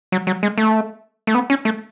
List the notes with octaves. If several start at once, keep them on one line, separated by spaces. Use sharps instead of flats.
F#3
F#3
G#3
A3
A3
B3
C#4
A3